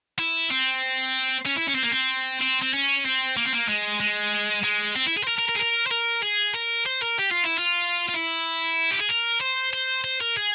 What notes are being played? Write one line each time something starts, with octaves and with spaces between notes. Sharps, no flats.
E4
C4
C#4
E4
C#4
C4
A#3
C4
C4
C4
C#4
C4
A#3
C4
A#3
G#3
G#3
G#3
C4
E4
G#4
C5
A#4
A#4
A#4
G#4
A#4
C5
A#4
G#4
A#4
C5
A#4
G4
F4
E4
F4
F4
E4
G4
G#4
A#4
C5
C5
C5
A#4
G#4